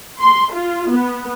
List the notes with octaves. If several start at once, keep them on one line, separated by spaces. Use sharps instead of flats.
C6
F4
B3